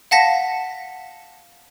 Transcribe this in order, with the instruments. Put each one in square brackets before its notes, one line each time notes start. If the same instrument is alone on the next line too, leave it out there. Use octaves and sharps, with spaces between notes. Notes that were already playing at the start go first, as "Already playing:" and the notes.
[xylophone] F5 F#5 A5 A#6 B6